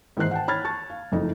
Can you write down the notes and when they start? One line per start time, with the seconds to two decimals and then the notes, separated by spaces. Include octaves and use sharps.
0.17 G#2 D#3 E3 C5 F#6 C7
0.31 F#5 G5 A5
0.48 C#5 B5 F6 G#6 A6
0.64 A5 C#6 A6
0.90 F5
1.12 F#1 F2 A3 D#4 D#5